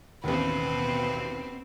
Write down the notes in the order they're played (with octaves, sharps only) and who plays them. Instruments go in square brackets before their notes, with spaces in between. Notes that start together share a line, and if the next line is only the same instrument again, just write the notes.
[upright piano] A1 D#2 [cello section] B2 C4 [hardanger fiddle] B4